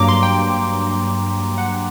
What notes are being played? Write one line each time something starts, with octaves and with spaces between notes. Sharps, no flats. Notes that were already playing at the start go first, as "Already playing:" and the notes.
Already playing: G2 F#3 A#3 A#5 D6
C6
G5
F#5